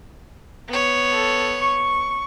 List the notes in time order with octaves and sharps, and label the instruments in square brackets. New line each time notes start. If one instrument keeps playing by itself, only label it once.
[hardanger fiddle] B3 C#5
[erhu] A4
C#6